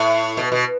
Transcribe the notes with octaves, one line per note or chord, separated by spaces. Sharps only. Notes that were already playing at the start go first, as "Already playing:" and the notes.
Already playing: A2
B2
B2